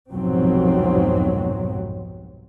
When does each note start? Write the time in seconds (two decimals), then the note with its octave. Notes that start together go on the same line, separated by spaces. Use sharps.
0.13 C2 F2 G#2 B2 F#3 C4